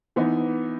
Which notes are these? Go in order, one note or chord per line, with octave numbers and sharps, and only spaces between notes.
E3 B3 D#4